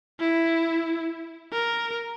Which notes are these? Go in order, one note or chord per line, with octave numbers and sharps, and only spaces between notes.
E4
A#4